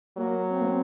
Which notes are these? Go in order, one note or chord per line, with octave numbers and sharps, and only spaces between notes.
F#3 A#3
C4
A#3
C4